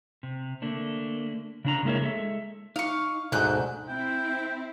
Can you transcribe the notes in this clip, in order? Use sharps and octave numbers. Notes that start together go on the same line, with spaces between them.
C3
D3 A3 A#3 D4
C#3 D4 A#5
G#3 A#3 E4 A#4 C#5
G#3 A4 E5
D#4 F5 C#6
D2 G#2 B2 D#4 A4 F#6 G6
C4 E4 G5